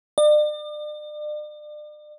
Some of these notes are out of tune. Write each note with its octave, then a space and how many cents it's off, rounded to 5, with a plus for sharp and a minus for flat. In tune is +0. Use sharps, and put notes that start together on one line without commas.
D5 +40